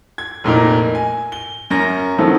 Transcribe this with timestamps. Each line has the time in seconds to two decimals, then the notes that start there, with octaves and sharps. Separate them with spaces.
0.18 G#6
0.44 F1 A#2 D#4 A#4
0.95 G#5
1.32 G7
1.70 F#2 C#4 A#4 A#6
2.18 D#3 F3 F#3 B3 C4 A4